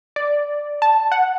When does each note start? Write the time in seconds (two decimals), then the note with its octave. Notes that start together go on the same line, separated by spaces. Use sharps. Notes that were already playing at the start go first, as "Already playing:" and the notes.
0.16 D5
0.82 A5
1.12 F#5